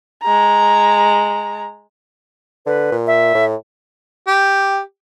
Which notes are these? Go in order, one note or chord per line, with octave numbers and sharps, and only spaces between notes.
G#3 A#5
D3 B4
A#2
E5
A2
G4